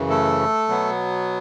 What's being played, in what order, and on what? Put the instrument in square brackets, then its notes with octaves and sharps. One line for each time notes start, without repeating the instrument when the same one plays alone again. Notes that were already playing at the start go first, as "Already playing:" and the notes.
Already playing: [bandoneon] F#2 C#3 E3
A3 A4
B2 F#3 B3